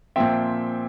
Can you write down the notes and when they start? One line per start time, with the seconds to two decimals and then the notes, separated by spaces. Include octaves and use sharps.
0.16 A#2 F3 C4 E5 G5